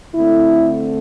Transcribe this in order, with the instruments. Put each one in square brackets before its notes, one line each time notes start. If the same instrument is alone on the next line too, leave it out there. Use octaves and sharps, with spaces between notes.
[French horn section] D3 A3 C4 E4